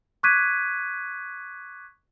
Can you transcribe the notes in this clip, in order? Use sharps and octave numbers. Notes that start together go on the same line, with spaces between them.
C#6 D6 F#6 G#6 B6 D#7